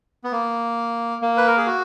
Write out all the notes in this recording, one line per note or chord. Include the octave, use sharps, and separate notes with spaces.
B3
A#3
A#3
B4
A#4
G#4
F#4